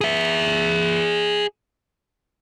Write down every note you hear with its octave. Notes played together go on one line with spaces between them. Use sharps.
G#4 E5